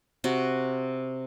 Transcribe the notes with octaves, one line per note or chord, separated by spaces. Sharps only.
C3 F#4